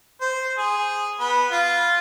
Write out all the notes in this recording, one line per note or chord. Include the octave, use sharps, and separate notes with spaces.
C5
G#4
B3
F4